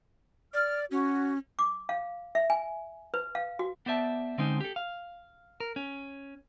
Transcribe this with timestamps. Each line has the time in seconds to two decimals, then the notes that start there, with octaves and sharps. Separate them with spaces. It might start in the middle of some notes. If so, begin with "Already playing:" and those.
0.54 D5 F6
0.91 C#4 F#4
1.59 D6
1.89 F5
2.35 E5
2.50 G#5
3.14 B4
3.35 F5
3.59 F#4
3.86 B3 G4 C5 D5 E5 A5
4.38 D3 G#3 C4 C#4 D#4
4.61 G4 A4
4.76 F5
5.60 A#4
5.76 C#4